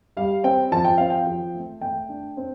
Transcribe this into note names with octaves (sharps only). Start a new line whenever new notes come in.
G3 F5
C4 G5
F3 A5
G5
C4 F5
G5
F3
A3
A3 G5
D4
C4